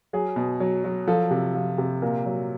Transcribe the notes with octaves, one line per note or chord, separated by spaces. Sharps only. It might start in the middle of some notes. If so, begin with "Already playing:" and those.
F#3 G#4
B2
F#3
F#3
F3 A4
C3
F3
C3
A#2 A#4
F#3